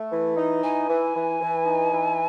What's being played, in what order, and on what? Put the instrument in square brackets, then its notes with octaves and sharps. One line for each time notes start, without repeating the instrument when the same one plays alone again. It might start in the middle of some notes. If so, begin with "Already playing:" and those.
Already playing: [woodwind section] A3
E3
D#4
[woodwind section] E3 [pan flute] G#5
[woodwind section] E3
E3
E3
D#4
E3